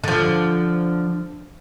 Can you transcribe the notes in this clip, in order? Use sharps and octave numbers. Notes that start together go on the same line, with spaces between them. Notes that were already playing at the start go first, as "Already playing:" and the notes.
D3 F3